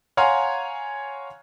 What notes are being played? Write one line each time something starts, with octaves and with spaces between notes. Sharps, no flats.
C#5 F5 F#5 G#5 A#5 C6